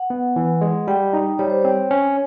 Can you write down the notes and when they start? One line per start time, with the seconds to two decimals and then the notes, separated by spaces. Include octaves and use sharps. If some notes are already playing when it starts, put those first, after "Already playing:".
Already playing: F#5
0.10 B3
0.36 E3
0.61 G#3
0.88 G3 G5
1.13 D#4
1.39 G3 C#5
1.50 C5
1.61 C4 C#5
1.91 C#4